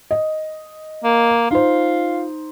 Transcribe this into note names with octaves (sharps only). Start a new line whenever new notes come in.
D#5
A#3
D#4 F4 C5